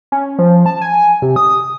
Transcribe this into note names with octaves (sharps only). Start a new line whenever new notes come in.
C#4
F3
A5
G#5
C3
D#6